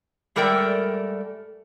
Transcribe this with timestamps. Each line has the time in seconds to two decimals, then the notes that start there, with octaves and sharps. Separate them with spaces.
0.36 G#2 G3 A3 A#4 D5 G5